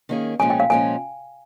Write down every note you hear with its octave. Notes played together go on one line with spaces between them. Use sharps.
D#3 A#3 C#4 G#4
A#2 F3 G#3 C#4 G#5
G5
F5
A#2 F3 G#3 C#4 G#5